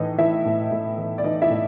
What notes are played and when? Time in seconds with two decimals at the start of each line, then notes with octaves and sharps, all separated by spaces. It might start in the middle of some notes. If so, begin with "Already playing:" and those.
Already playing: A2 E3 D#4 D#5
0.18 E3 E4 E5
0.45 A2
0.71 A2
0.97 E3
1.18 D5
1.24 E3 D#4 D#5
1.42 E4 E5
1.50 A2